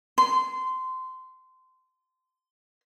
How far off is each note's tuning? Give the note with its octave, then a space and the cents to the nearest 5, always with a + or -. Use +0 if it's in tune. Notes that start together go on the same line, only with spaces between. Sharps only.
C6 -20